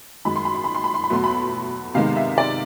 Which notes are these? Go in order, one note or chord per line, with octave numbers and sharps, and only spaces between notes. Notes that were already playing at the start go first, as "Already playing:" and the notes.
F#2 D#3 G#3 B5
C6
B5
C6
B5
C6
B5
C6
B5
E2 B2 F#3 A3 C6
B5
C3 D#3 G#3 B3 F5
E5
D5